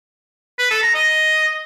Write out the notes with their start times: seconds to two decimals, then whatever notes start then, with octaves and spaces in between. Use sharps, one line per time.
0.59 B4
0.71 A4
0.83 A#5
0.95 D#5